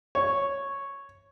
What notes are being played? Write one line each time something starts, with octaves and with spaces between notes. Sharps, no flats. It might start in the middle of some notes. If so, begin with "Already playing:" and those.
C#5